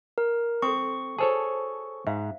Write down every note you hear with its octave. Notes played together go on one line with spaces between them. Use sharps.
A#4
C4 A4 C6 C#6 D#6
F#4 G#4 A4 C5 C#5 A5
G#2 E5 F5